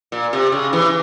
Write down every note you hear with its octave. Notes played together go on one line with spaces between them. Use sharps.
A#2
C3
C#3
E3